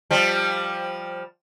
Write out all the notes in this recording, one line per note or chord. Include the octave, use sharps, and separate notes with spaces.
F3 G3